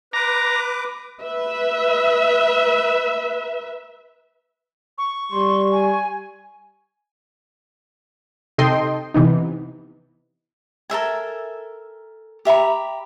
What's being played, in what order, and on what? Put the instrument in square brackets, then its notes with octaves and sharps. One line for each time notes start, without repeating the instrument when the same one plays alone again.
[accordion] B4 D6 [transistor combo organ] A#5
[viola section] B4 E5
[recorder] C#6
[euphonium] G3 [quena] C6
[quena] G#5
[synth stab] C3 D#4 A4 D#5 G5 C6
C3 E3 B3 D#4
[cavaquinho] A4 A#4 E5 G#5
G4 E5 A#5 B5